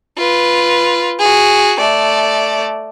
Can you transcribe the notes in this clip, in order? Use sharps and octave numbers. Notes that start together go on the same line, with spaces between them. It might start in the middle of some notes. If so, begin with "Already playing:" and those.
F4 B4
F#4 G#4
A3 D5